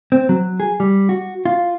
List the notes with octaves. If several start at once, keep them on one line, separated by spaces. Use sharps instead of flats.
C4
F#3
G#4
G3
F#4
F4